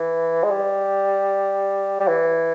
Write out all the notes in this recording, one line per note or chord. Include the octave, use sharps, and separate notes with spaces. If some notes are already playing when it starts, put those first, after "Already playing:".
Already playing: E3
G#3
G3
G3
E3